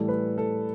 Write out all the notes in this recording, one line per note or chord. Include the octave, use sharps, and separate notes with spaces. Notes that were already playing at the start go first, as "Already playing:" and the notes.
Already playing: A2 E3 G3 A4
B4
A4